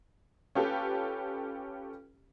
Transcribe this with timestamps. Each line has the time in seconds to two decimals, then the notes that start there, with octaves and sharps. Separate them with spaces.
0.55 C#4 F4 G4 A4 B4